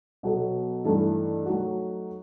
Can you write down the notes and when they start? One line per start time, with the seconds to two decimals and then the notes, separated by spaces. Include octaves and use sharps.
0.23 B2 F#3 B3 F#4 A4
0.84 G2 E3 A3 D#4 A4
1.46 F#3 A3 D#4 F#4